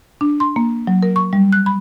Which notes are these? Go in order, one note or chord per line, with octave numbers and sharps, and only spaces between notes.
D4
C6
A#3
F#3
A#4
C#6
G3
F#6
B5